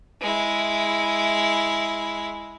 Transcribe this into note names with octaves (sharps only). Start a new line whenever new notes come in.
G#3 E4